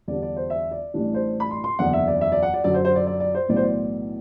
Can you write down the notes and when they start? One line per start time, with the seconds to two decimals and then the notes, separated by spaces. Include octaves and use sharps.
0.08 E2 D3 G3 D4 D5
0.22 D5
0.37 C5
0.50 E5
0.71 D5
0.94 A1 A2 E3 G3 D4
1.14 C5
1.40 B5
1.51 C6
1.64 C6
1.79 F#1 E2 D3 F#5
1.93 E5
2.07 D5
2.21 E5
2.32 D5
2.43 F#5
2.54 D5
2.64 F#2 D3 F#3 D5
2.74 C5
2.85 C5
2.96 D5
3.07 D5
3.20 D5
3.35 C5
3.49 B1 A2 E3 B3 D5
3.56 C5
3.63 D5